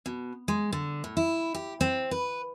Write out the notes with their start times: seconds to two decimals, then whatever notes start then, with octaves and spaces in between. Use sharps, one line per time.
0.06 B2
0.48 G#3
0.73 D3
1.04 A2
1.17 E4
1.55 G4
1.81 C4
2.11 B4